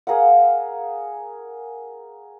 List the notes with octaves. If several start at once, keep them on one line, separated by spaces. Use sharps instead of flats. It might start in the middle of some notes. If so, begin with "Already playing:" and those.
G#4 A#4 F5 F#5